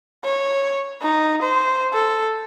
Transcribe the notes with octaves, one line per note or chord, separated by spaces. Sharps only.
C#5
D#4
C5
A4